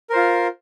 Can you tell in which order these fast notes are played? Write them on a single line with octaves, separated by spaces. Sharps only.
A#4 C5 F4